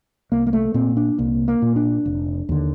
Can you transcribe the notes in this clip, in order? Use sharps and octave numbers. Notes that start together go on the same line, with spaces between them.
C2 A#3
A#3
A3
A#2 C4
D4
C2 A#3
A#3
A#2
D4
F1
D#2 D3